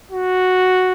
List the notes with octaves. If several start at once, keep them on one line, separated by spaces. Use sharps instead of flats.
F#4